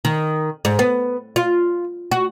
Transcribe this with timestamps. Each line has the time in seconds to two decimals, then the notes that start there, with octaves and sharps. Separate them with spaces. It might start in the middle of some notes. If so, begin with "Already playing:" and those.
0.05 D#3
0.65 G#2
0.79 B3
1.36 F4
2.12 F#4